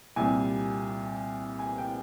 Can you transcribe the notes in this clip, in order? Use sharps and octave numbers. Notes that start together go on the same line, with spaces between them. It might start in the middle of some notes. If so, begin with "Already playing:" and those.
C2 A#2 G3 G#5
G#5
G5